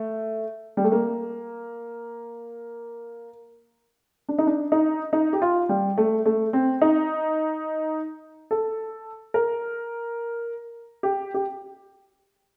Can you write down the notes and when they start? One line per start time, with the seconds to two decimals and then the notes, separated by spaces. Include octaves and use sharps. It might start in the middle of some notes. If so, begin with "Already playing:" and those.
Already playing: A3
0.77 G3
0.84 A3
0.92 A#3
4.29 D4
4.39 D#4
4.47 D4
4.72 D#4
5.13 D#4
5.33 G4
5.42 F4
5.69 G3
5.98 A3
6.26 A3
6.53 C4
6.82 D#4
8.51 A4
9.34 A#4
11.03 G4
11.34 G4